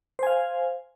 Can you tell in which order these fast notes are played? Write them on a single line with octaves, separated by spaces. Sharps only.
C5 G#5 F5